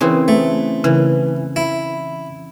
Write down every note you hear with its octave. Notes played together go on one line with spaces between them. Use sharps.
C#3 E3 C4
A3
C#3 E3
E4